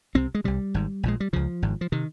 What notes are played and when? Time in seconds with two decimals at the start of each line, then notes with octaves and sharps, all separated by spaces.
0.15 C2 C3 C4
0.35 G#3
0.44 C2 C3 G3
0.74 G#1 G#2
1.03 A#1 A#2 G#3
1.20 G3
1.33 C#2 C#3 F3
1.62 G#1 G#2
1.81 F3
1.92 C3 D#3